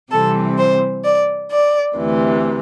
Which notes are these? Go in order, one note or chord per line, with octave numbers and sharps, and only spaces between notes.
C3 E3 G3 C4 A4
C5
D5
D5
D2 C3 E3